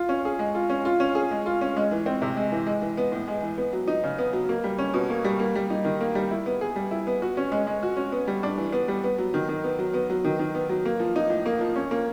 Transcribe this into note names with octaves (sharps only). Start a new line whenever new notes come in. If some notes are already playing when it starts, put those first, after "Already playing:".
Already playing: F4
C#4
G#4
G#3
F4
C#4
F4
C#4
G#4
G#3
F4
C#4
G#3
E3
C4
C3
G#3
E3
G#3
E3
B3
A2
G#3
E3
B3
F#3
D#4
C#3
B3
F#3
A#3
G3
C#4
B2
A#3
G3
A#3
G3
D#4
D#3
A#3
G3
E4
B3
G#4
G3
E4
B3
F#4
C#4
G#3
G#3
F#4
C#4
B3
G3
D4
E3
B3
G3
B3
F#3
D#3
D#3
B3
F#3
B3
F#3
D#3
D#3
B3
F#3
A#3
F3
D#4
A2
A#3
F3
C#4
A#3